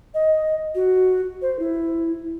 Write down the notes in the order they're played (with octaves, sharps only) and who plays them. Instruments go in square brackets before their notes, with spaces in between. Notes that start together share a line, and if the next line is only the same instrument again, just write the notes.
[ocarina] D#5
F#4
C5
E4